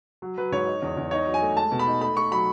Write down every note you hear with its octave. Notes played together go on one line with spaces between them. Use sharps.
F#3
F#3 B4
G#2 C#5
D#4
E2
E2
D#4 C#5
F#3
G#5
A3
G#3 A5
B2
B5
D#4
A3 B5
A3 C#6
F#3 B5